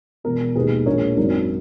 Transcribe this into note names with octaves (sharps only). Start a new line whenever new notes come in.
E1 E2 B2 A#4
E1 D#2 D#3 A#3 G#4 B4
A#1 A#2 G#3 A#4 C#5
G#1 F#2 D#3 F#3 A#4